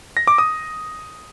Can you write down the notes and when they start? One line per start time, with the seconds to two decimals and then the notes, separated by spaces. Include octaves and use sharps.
0.17 A#6
0.27 D6
0.38 D#6